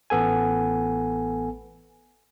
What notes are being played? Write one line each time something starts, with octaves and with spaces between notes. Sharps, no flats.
A1 B3 A4 G#5